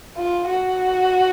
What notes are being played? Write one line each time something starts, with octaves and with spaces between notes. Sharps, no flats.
F4
F#4